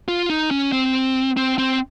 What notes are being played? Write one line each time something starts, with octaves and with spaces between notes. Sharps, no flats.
F4
D#4
C#4
C4
C4
C4